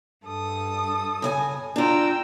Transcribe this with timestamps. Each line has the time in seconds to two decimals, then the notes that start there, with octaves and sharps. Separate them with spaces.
0.24 G2 A4 D#6
1.22 C#3 F5 G#5
1.76 D4 F4 G5 A#5 E6